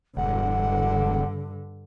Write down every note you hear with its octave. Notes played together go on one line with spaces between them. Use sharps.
E1 G2 D3 F#5